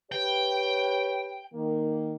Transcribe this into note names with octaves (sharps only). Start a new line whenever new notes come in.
G4 B4 C#5 G5
D#3 A#3